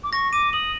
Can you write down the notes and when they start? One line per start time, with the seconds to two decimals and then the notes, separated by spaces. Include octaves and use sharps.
0.04 D6
0.13 C#6 A#6
0.32 D6 D#7
0.53 D#6 F#7